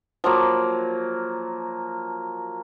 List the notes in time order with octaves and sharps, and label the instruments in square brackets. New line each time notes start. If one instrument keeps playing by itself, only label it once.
[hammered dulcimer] F3 F#3 A#3